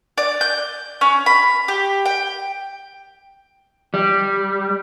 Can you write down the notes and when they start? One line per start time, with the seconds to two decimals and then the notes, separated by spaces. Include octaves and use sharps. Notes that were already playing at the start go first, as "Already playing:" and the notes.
0.18 D5
0.41 G6
1.01 C#4
1.26 B5
1.68 G4
2.05 G5
3.94 G3